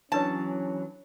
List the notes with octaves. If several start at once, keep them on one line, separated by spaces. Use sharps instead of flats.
E3 F#3 C#4 D4 B4 C#5 A5